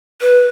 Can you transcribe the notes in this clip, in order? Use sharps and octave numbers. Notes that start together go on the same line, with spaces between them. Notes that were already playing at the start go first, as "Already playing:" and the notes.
B4